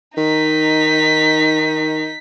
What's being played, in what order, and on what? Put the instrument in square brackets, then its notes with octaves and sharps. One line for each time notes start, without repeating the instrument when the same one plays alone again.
[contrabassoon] D#3 [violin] D#4 B6